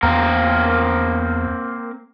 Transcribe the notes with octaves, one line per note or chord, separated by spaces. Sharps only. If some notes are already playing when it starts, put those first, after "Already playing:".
E2 A#3 C4 A#4